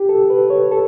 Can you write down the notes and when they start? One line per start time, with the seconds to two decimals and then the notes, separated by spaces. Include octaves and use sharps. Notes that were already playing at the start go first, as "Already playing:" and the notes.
Already playing: G4
0.09 A4
0.30 B4
0.50 C#5
0.71 A4